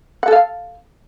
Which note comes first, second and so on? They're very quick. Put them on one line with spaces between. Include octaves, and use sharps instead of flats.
F#5 A4 F5